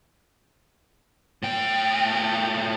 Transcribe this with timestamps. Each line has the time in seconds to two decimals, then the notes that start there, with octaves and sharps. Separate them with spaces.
1.43 A2 G5